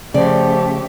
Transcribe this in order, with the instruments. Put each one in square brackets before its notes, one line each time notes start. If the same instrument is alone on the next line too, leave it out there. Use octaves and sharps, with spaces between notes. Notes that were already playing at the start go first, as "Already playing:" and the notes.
[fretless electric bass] C#3 [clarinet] F3 [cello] A3 G4 [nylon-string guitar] D5